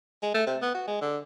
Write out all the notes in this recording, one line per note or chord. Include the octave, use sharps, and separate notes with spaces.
G#3
A3
C3
B3
F#4
G#3
D3